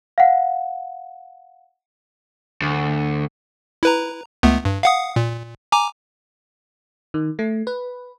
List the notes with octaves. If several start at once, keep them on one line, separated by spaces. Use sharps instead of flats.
F5 F#5
D2
E4 B4 A#5
C#2 A3 B3
G2
F5 F#5 D#6
A#2
G#5 A#5 D6
D#3
A3
B4